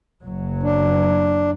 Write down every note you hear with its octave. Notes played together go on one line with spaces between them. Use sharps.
F#1 F#3
D4